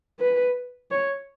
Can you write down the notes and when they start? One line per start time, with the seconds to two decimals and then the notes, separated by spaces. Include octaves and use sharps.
0.20 B4
0.91 C#5